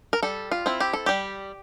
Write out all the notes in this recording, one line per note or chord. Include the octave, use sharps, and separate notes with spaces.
A#4
G3 A4
F4
C4 E4
G4
A4
G3 G4